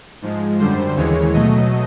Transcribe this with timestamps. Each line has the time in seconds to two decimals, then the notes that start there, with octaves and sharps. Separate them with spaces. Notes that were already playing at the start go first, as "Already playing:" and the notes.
0.22 G#2 F3 G#3
0.59 F#2 D3 G3 C5
0.96 D#2 C#3 E3 G#3 C#5
1.33 B2 F#3 A3 D#5